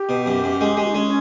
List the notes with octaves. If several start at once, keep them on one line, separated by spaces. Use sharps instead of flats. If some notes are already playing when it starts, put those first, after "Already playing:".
Already playing: G4
B2
F#2
F#2
G#3
G#3
G#3 C#4